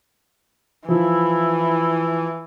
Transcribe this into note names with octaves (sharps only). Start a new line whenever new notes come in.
E3 F3 E4